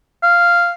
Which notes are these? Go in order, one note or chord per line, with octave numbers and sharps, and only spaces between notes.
F5